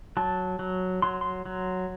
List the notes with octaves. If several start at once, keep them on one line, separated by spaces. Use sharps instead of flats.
F#3 A5
F#3
F#3 C6
C6
F#3